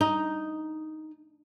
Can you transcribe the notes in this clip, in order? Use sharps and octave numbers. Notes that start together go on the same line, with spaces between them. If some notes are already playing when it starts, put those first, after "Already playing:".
D#4